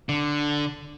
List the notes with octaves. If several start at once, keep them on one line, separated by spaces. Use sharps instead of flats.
D3